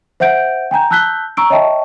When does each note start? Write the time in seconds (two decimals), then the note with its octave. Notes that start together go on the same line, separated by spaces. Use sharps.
0.20 C5 E5 F#5 G6 D7
0.71 G5 G#5 A#5 G6
0.91 A5 E6 F#6 G6 B6 G7
1.37 A#5 C#6 E6 D7
1.50 C#5 D#5 E5 G5 A5 C#6